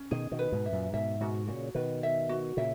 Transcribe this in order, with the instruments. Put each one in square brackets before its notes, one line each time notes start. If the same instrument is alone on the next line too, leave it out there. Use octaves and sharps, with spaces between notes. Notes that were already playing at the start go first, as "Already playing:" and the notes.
Already playing: [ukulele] C#4
[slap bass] B2 D#3 [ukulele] G#4
[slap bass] B2 D#3
[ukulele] B4
[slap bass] G#2 B2
[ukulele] E5
[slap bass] F#2 A#2
[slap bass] G#2 B2 [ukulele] E5
[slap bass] G#2 B2 [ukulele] F#4
[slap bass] A#2 C#3 [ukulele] F#4
[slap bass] B2 D#3 [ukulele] B4
[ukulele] E5
F#4
[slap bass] A#2 C#3 [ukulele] E5